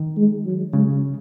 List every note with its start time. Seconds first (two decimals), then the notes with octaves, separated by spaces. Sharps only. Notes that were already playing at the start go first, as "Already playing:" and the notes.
Already playing: D#3
0.17 G#3
0.46 F#3
0.73 C#3 G#3